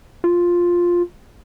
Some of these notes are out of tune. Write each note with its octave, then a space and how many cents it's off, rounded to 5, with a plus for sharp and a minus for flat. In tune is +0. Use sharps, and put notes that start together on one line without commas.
F4 +5